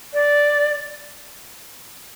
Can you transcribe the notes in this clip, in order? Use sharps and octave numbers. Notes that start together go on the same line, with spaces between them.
D5